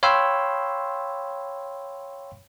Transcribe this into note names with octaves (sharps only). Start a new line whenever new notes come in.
C#5 F5 G5 B5 C6 E6